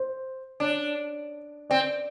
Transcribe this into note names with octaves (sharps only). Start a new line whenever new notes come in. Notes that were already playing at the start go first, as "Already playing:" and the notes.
Already playing: C5
D4 C#5
C4 D5